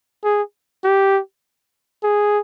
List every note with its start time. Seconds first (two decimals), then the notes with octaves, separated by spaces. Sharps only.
0.24 G#4
0.84 G4
2.04 G#4